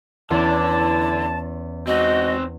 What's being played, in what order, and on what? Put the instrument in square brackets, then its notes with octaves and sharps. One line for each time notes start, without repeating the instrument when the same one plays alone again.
[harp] E2 C#4 C6 [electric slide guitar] D3 D4 [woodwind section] E3 E4 A5
[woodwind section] G#3 F#4 [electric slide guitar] C4 D#4 [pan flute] D#5